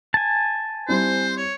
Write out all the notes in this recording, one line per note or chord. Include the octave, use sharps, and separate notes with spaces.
G#5 A5
G3 C4 E4 C5
C#5